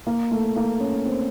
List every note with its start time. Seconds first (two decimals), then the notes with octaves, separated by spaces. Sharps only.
0.07 A#3
0.31 A3
0.56 A#3
0.80 C#4
1.06 C4